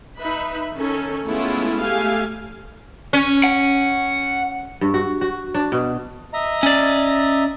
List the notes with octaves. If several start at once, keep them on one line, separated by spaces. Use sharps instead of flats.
D#4 B4 E5 B5
D#3 C#4 A4
G#3 A3 B3 C#4 E4 F4
A3 G4 F5 G#5
C#4
F#5
G2
F#4
F#4
D4
B2
D#5 E5 A#5
C#4 D5